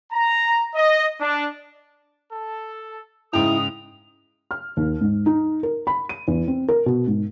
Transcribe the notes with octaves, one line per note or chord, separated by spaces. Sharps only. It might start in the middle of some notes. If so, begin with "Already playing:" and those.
A#5
D#5
D4
A4
G#2 C#3 E4 G5 D#6 F7
F6
D#2
G#2
D#4
A#4
B5
D#7
E2
C4
A#4
B2
G#2